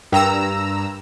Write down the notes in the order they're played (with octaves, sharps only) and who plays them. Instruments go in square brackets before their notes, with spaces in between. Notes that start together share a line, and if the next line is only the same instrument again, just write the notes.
[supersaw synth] G2 A#5 E6 [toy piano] A#4 G5